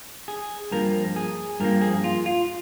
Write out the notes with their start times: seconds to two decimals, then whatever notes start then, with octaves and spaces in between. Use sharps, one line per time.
0.28 G#4
0.71 G2 F3 A#3 A#4
1.16 G#4
1.60 G2 F3 A#3 A#4
1.82 G#4
2.04 F4
2.26 F4